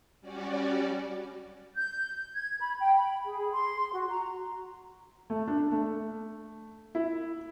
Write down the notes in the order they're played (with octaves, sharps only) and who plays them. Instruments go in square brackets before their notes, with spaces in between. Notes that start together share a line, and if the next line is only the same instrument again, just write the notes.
[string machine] G3 C#4 F#4 D5
[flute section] G6
G#6
B5
G5
B5
G#4
C6
F#4
A#5
[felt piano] A3
D4
A3
E4